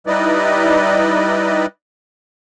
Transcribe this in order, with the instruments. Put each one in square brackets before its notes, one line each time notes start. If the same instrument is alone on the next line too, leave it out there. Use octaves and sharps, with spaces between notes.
[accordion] G3 D#4 E4 B4 D5 D#5